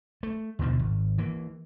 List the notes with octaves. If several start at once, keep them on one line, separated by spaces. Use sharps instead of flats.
A3
D#2 B2 D3 F3
G#1
E3 A#3